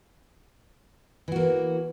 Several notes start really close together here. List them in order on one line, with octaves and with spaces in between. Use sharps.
E3 F#4 A#3